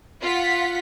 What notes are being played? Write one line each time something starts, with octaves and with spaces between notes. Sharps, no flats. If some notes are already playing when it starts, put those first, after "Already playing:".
F4 F#5 B6